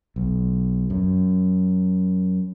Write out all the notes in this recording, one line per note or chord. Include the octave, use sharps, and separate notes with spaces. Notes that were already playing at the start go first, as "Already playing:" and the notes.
B1
F#2